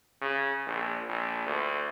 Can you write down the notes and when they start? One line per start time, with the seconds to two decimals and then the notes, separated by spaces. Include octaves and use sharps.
0.22 C#3
0.66 A#1
1.09 A#1
1.46 D2